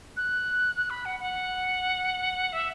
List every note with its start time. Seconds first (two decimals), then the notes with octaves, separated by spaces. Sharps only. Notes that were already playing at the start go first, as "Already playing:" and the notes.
0.17 F#6
0.76 F#6
0.90 B5
1.05 F#5
1.20 F#5
2.53 E5